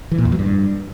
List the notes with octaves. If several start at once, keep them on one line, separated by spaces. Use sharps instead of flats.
E3
A#2
E2
F#3
G2